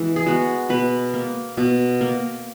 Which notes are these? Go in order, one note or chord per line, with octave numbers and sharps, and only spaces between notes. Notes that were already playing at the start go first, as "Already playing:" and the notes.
Already playing: E3 G#3 B3
G#4
G#3 B3 F#4
B2 B4
A#3
B2
A#3